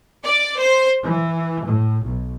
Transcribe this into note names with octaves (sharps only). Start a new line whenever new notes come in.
D5
C5
E3
A2
B1